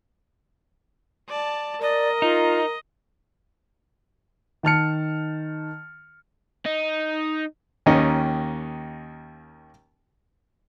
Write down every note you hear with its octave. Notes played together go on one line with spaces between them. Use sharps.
D5 A5
A#4 D5 D#5
D#4 F4
D#3 A5 F6 C#7
D#4
D#2 D#3 A#3 C#4 D#5